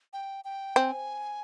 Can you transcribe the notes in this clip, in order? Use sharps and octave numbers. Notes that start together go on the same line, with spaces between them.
G5
G5
C4 G#5